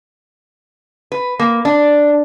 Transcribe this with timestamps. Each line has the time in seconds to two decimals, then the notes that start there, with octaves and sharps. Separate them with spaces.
1.12 B4
1.39 A#3
1.65 D4